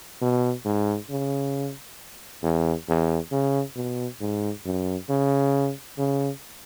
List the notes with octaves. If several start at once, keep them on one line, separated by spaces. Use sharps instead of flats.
B2
G#2
C#3
E2
E2
C#3
B2
G#2
F#2
C#3
C#3